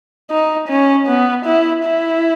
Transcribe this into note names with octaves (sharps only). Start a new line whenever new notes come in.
D#4
C#4
B3
E4
E4